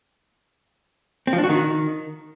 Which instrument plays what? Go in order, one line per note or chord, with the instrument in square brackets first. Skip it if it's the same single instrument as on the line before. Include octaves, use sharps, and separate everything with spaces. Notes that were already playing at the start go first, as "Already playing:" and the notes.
[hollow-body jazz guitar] C4
F3
D4
F#4
D#3